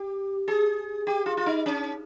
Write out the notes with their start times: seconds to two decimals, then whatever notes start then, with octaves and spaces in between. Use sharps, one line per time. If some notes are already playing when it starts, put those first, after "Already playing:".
Already playing: G4
0.48 G#4
1.07 G4
1.26 F4
1.37 F4
1.46 D#4
1.66 C#4